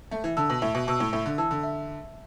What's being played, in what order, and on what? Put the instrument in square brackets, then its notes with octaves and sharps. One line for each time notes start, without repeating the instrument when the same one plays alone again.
[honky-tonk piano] A3 [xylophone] E5
[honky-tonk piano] E3
[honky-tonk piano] D3 [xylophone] A5 E6
[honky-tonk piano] B2
[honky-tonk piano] A2 [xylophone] E5
[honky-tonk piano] B2
[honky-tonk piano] B2 [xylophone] A5 E6
[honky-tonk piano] A2
[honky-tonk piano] A2 [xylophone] E5
[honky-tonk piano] D3
[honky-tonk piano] E3 [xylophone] A5 E6
[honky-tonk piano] D3
[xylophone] E5